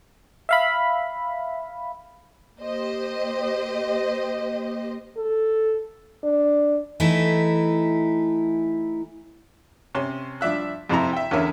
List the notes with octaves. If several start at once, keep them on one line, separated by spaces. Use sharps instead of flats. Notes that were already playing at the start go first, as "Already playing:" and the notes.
E5 F5 B5
A#3 G4 C5 D#5
A4
D4
E3 A3 D#4 E4
C3 C#4 C6
G2 F3 D4 E5 F#6
F2 C3 C4 E4 A#5
E5 G5
E2 D3 C#4 A#4 E5